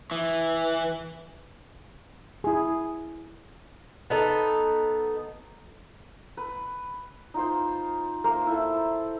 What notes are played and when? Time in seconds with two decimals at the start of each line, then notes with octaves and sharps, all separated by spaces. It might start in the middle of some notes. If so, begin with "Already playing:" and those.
0.11 E3
2.44 E4 G#4
4.10 B3 D#4 A4
6.37 B4
7.34 D#4 F4 C5
8.24 A#3 A#4 C5
8.47 E4 A4